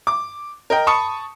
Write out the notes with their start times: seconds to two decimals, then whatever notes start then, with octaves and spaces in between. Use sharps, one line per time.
0.07 D6
0.70 A#4 D#5 G5
0.87 A5 B5 C#6 D#6 C#7